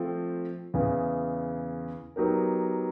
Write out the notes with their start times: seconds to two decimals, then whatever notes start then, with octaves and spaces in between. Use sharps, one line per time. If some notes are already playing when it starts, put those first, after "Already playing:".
Already playing: F3 A3 C4
0.74 E2 C#3 E3
2.16 F#3 B3 D#4 G4 A#4